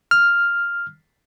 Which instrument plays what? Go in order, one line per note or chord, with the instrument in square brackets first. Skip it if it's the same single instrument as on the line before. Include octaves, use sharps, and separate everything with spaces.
[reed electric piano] F6